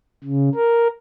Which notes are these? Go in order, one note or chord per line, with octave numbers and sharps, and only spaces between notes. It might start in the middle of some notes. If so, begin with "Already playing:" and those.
C#3
A#4